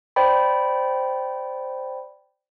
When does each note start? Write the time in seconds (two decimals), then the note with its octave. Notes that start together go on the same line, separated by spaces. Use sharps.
0.16 C5 D5 G5 B5